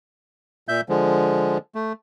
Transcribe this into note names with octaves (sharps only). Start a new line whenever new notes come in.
A#2 E5 G6
D3 F3 G#3
A3